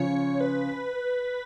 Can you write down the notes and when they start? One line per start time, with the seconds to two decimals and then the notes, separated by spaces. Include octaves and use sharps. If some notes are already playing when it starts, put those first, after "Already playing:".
Already playing: C#3 F3 C#5
0.41 B4